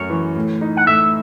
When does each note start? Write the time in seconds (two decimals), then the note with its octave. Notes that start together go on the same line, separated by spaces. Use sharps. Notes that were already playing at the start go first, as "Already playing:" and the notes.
Already playing: F#2 A3 C#5
0.10 E3
0.36 A2
0.61 D#4
0.77 F#5
0.87 A2 E5